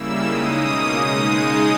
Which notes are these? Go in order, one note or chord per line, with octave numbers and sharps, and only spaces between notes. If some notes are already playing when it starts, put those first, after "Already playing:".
Already playing: C#3 G3 A#3 E4 E6
C#3 G#3 D#4 D#6
B2 A#3 C#4
C#3 G#3 D#4